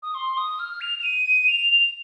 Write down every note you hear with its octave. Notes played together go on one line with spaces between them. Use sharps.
D#6
C6
D#6
F6
F7
F7
D#7
F7